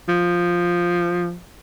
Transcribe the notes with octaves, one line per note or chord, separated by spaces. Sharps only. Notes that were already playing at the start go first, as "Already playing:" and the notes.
F3